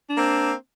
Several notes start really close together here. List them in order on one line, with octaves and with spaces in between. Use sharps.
D4 A#3 C4